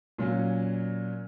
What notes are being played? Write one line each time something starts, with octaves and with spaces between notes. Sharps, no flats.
A#2 F#3 C#4